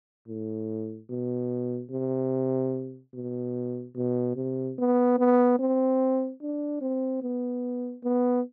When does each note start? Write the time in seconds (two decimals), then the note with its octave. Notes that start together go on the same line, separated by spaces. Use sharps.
0.28 A2
1.10 B2
1.91 C3
3.14 B2
3.96 B2
4.36 C3
4.78 B3
5.19 B3
5.59 C4
6.42 D4
6.82 C4
7.23 B3
8.04 B3